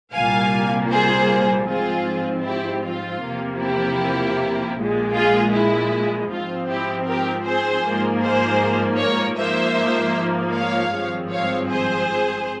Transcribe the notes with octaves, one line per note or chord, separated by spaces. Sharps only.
C2 A#2 G3 A#3 F5 G#5
G#4 C5
G#2 F3 C4 F4 G#4
E4 G4
F4
E2 C3 F3 A#3
E4 G4
A#1 A#2 G#3
F4 G#4
E4
G#2 F3 C4 F4
E4 G4
G4 A#4
G#4 C5
G#2 F3 A#3
G#4 C5
A#4 C#5
G#2 F3 A#3 C5 E5
C#5 F5
G#1 G2 F3 G#3 C4
C#5 F5
G#4 C5